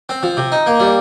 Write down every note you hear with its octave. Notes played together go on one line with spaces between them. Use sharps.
C4
F3
C3
D#4
A#3
G3